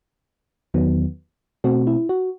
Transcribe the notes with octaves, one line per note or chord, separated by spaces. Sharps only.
E2 D#3 F#3 B3
B2 A3 C4 F#4
E4
F#4